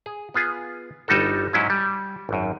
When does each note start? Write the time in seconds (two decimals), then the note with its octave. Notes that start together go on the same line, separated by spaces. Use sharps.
0.06 G#4
0.34 B3 F4 G#4
1.08 G1 G3 D#4 F#4 A4
1.53 G#2 F#3 C#4 E4
1.70 G3
2.29 G#1 F#2